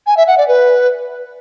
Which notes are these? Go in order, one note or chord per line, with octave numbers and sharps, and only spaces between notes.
G#5
E5
F#5
D5
B4